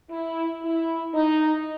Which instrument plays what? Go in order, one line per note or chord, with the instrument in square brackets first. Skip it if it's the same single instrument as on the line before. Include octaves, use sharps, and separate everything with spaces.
[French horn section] E4
E4
D#4